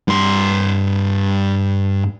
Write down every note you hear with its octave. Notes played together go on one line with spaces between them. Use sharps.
G2 C6